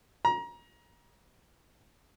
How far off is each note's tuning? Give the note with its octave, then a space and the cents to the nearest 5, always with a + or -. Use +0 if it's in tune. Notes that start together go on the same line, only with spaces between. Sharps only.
A#5 +25